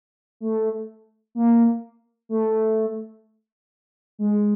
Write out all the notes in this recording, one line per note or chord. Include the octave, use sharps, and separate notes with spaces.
A3
A#3
A3
G#3